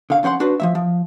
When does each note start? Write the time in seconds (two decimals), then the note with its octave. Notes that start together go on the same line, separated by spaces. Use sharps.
0.10 D3 F5
0.23 F2 C#4 C5 F#5 C6
0.40 D4 F#4 B4 C5
0.60 F3 F#3 E5
0.75 F3